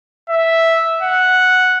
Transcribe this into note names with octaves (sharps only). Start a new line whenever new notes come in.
E5
F#5